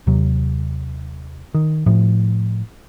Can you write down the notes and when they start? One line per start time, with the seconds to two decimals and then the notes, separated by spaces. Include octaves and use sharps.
0.07 D#2 C3 F#3
1.54 D#3
1.86 A2 F3